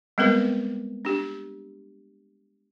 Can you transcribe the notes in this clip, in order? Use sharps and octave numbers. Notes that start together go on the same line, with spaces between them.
G3 G#3 B3 C4 A#4 B4
D4 G4